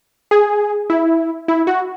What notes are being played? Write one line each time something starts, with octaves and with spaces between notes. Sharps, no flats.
G#4
E4
E4
F#4